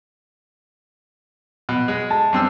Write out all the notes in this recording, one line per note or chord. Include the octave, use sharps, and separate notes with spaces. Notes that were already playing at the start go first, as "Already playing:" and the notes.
B2
G#3
A5
G2 C4 E6